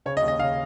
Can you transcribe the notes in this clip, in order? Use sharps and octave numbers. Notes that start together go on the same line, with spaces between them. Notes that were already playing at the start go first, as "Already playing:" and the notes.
C#3 C#5
D#5
D#2
D#5
C#3 F5